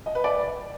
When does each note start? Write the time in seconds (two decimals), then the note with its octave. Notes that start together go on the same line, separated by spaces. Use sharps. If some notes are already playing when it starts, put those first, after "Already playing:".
0.06 D#5
0.15 B4
0.24 D5